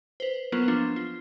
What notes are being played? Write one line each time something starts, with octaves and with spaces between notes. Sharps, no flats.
B4 C5
F#3 A#3 B3 F4 A#4 B4
F3 A#3 D4 F4
F4